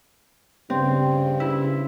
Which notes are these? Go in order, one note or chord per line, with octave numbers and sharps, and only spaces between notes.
G2 C#3 C4
E4